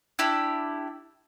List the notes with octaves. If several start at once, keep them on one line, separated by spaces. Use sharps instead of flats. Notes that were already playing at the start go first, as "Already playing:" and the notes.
D4 E4 G4